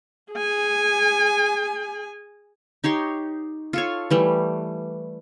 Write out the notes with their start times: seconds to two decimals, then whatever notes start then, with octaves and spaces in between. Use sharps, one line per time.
0.33 G#4 G#5
2.84 D#4 G4 C#5 C6
3.73 F4 A4 C#5
4.10 E3 G3 A3